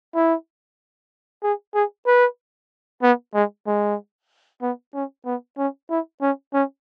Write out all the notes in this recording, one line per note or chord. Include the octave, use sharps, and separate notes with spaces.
E4
G#4
G#4
B4
B3
G#3
G#3
B3
C#4
B3
C#4
E4
C#4
C#4